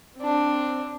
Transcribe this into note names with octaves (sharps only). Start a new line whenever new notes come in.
C4 D4